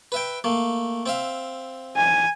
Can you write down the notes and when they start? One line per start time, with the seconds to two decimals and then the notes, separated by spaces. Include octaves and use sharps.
0.12 B4 E5 G5
0.44 A3 A#3
1.06 C4 E5 F5
1.97 G#5